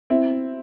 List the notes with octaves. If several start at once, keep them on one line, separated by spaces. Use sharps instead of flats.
C4 E4